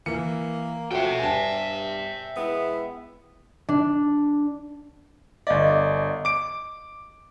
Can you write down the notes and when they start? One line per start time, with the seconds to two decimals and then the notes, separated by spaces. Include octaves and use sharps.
0.06 E3 A#3 C#7
0.91 F3 A3 C#4 F#4 E5 G5
1.19 G2 G#5 A5
2.37 G#3 B3 E4
3.69 D4
5.47 G1 D5 D#5 F5
6.25 D6 D7